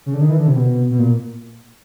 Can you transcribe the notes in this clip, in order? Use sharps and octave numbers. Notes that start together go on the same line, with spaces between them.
C#3
D3
D#3
E3
D3
C3
B2
B2
A#2